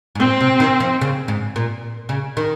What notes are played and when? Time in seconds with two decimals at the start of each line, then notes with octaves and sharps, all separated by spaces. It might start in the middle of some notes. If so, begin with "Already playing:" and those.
0.15 G#2
0.19 A#2 C4
0.41 C3
0.60 D#3
0.80 F3
1.01 C#3
1.28 G#2
1.56 A#2
2.09 C#3
2.37 D#3